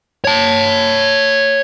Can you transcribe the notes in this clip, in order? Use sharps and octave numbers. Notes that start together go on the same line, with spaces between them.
C#5 A5